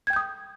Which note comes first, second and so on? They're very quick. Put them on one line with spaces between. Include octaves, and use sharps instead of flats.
G#6 G5 G6 D#6